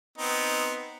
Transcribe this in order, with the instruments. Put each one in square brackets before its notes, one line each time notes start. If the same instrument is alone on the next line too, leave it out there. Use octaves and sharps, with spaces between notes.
[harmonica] B3 C4 D#4